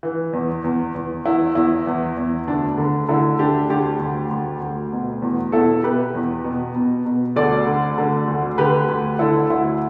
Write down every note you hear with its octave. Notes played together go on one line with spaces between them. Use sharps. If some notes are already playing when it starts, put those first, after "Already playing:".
E3
E2
E2
E2
E2 E4
E2 E4
E2
E2
D2 D4
D3
D3 E4
D2 D4 G4
D2 D4 G4
D2
D2
D2
B2
E2
B2 E4 A4
B2 G4 B4
E2
B2
B2
B2
D2 A4 D5
D3
D3
D2
D3 G4 B4
D2
D3 E4 A4
D2 E4